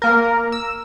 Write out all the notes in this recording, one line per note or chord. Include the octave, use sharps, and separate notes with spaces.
A#3 A#4
E6